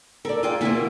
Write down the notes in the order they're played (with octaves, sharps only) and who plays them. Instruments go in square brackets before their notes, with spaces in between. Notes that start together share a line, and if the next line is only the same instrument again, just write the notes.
[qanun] A4 [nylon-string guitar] A#4 D5
[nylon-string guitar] F4 G#4 G5
[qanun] B2 E3 E5 [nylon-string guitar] A#3 E4 C5